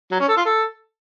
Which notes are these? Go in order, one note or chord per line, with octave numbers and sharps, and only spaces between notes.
F#3
C#4
A4
F4
A4